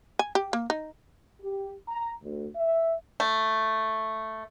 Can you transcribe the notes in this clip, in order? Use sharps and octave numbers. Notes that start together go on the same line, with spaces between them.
G#5
G4
A#3
D#4
G4
A#5
D2
E5
A3